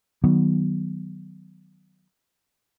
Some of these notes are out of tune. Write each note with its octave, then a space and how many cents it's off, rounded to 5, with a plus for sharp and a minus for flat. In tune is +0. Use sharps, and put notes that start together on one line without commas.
D#3 +0 F#3 +15 B3 +0